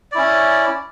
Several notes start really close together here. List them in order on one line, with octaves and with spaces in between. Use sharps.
D5 E4 C#4